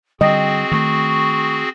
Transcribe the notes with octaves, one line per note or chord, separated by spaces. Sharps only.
D3 G3 C4 F#4 G#4 D#5 G5
D#3 A3 C#6